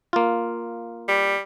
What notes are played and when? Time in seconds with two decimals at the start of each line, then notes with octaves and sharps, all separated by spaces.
0.13 A#3 F4
1.09 G3